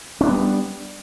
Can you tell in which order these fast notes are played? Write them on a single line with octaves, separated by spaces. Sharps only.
C#4 D4 B3 G3